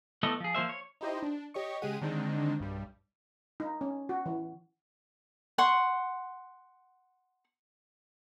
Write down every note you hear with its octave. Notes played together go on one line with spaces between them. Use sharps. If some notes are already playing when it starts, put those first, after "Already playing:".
E3 A3 B3 A4 D#5
F3 G#4
F3 A#3 C5 E5
C#5
D#4 E4 G4 C5 D#5
D4
G4 C#5 D#5 C#6
C#3 G#3 G4 G#4 F#5 D#7
D3 D#3 G#3 C4 D4 D#4
B1 G2 G3
D#4
C#4
F#4
E3
F#5 C6 C#6